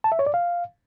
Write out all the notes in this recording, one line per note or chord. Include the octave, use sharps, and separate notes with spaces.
A5
E5
C#5
D5
F5